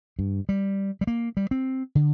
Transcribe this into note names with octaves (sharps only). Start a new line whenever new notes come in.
G2
G3
G3
A#3
G3
C4
D3